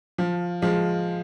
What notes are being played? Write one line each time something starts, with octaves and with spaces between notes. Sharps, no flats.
F3
F3 G#3